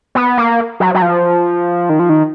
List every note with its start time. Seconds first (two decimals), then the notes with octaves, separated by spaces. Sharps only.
0.15 B3
0.37 A#3
0.80 F#3
0.95 F#3
1.02 F3
1.89 D#3
1.99 F3
2.09 D#3